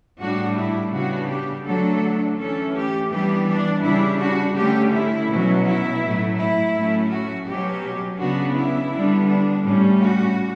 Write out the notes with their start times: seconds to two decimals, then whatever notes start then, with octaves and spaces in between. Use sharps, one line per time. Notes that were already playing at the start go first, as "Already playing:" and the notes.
0.20 A2 G3 D4 F#4
0.56 E4
0.93 C#3 G3 B3 D4 F#4
1.29 G4
1.65 D3 F#3 A3 D4 A4
2.38 E3 A3 C#4 A4
2.75 G4
3.11 E3 G3 B3 D4 G4
3.48 D4
3.83 C#3 G3 D4 E4
4.20 F#4
4.56 D3 A3 C#4 G4
4.93 E4
5.29 B2 F#3 C#4
5.65 E4
6.02 A2 F#3 A3
6.39 E4
6.74 A2 F#3 A3 C#4
7.11 F#4
7.47 B2 F#3 C#4 G4
8.19 C#3 F#3 B3 D4 F#4
8.56 E4
8.92 D3 G3 B3 D4
9.28 D4
9.65 A2 G3 C#4
10.01 F#4